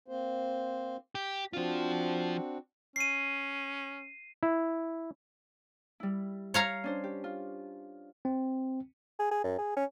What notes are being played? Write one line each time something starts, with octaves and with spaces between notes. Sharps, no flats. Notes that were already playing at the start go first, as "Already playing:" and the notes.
A#3 C4 C5
G4
F3 C4 D4 F4 F#4
C#4 C7 D#7
E4
G3 E4
C#5 F5 A#5
C#4 D4 C5
G4
F4
C4
G#4
G#4
F#2
G#4
C#4